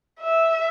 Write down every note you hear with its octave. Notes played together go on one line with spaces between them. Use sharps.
E5